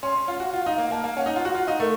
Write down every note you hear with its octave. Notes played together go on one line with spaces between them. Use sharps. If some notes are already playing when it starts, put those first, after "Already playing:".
C#4 C6
C#4
F4
F#4 F#5
F4 F#5
F5
D#4
A#3 D#5
A#3 A5
A#3
C#4 F#5
D#4
F4 F#5
F#4
F4 F#5
D#4 D#5
A3 A#4